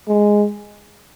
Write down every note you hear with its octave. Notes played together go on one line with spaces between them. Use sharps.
G#3